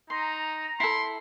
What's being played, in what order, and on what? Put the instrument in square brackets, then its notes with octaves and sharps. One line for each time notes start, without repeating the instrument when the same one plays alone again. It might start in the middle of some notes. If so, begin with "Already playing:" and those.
[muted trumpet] D#4 [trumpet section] A#5 [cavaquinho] C6
[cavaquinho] E4 A4 [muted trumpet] C6